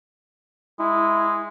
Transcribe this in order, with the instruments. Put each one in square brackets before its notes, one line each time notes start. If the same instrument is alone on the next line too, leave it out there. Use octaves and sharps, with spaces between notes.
[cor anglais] G#3 [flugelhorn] E4